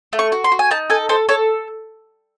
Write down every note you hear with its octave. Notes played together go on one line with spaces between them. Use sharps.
A3
C#6
F#4
C6
F#4
G#5
D#4 A5
A4 G#5
A4 C5
A4 C#5